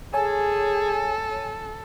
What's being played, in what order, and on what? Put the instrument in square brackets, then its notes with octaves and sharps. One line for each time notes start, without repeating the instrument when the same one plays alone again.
[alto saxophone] G#4 [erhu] A4 [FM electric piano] C#5 G#5